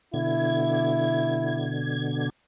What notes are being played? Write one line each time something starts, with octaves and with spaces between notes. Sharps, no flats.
B2 D3 E4 G#6